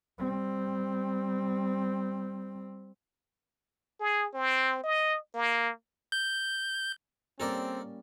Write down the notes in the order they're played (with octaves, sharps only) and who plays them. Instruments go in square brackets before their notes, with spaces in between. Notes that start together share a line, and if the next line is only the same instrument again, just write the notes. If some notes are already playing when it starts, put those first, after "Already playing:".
[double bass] G3 C4
[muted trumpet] G#4
C4
D#5
A#3
[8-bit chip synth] G6
[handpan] G3 A#3 C#4 [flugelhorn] C4 [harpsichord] A4 A#4 D5